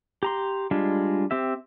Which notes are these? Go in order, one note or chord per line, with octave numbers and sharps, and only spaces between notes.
G4 A#5 C6
G3 G#3 D4 F4
C4 G4 E5